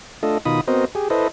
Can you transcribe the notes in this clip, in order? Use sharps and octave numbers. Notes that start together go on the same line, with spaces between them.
A3 D4 F4 A4 D#5
B2 D#3 D#4 F4 B5 D#6
B3 C4 F#4 A#4 C5 D#5
G4 G#4
E4 A4 B4 C5 D#5